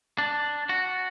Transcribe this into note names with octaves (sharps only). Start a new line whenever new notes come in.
D4
F#4